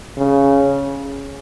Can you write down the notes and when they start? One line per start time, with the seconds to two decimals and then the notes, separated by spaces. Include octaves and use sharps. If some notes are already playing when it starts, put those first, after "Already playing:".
0.18 C#3